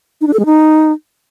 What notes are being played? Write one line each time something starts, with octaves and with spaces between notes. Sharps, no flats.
D#4
D4
A4
G#3
D#4